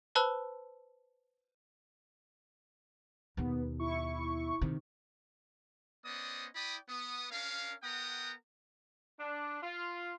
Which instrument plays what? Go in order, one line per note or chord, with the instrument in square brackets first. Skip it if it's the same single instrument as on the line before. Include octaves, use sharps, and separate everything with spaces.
[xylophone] B4 C5 A5 B5 E6 F#6
[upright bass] D#2 B2 [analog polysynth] B3
[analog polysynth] E4 C#6
[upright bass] C3 D#3
[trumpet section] B3 C#4 C5 D5 D#5 D#6
E4 D5 G5 B5 D#6
B3 D#6
C#4 D4 A#4 F5
B3 A#4 F#5 G5 A#5 D#6
[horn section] D4
F4